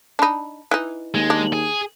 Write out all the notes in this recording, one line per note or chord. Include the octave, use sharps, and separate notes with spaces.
D4 D#4 A5 B5
E3 D#4 F#6
D#2 G#3
D4
G#4